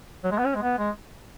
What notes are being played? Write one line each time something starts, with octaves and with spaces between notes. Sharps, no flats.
F#3
G#3
B3
C#4
G#3
B3
G#3